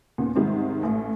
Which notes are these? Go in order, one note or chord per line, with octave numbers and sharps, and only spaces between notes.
D#2 A#2 C#3 B3
G#2 C3 D#3 G3 G#3
A1 A2